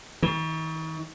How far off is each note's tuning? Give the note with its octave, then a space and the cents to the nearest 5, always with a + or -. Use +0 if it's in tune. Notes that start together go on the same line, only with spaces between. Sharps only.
D#3 +45